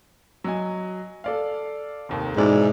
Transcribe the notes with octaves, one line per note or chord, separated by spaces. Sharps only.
F#3 D#5 G#5
A4 D5 F5
F1 D#2
G#2 B2 E3 D5